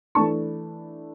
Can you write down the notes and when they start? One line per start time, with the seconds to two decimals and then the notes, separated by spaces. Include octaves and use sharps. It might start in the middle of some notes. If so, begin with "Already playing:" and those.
0.15 E3 A3 D4 A5 C#6